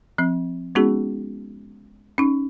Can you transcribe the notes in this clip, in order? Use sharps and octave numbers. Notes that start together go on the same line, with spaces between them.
F3 C4
G#3 B3 C#4 D#4 F#4 G#4
C#4 D#4